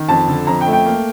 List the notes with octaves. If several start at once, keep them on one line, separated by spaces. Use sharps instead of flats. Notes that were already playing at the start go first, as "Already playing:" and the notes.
Already playing: D#3
F2 A5
D3
F2 A#5
G5
A3
G5
A#3